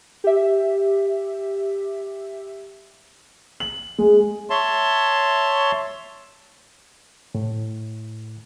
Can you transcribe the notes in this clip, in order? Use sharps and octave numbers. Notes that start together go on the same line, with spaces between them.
G4 E5
F#7
G#3
C#5 E5 A5 C6
A2